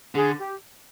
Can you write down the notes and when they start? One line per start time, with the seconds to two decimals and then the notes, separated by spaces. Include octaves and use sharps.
0.15 D3 G#4
0.38 G4